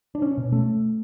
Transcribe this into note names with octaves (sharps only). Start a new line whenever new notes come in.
D4
C#4
B2
A3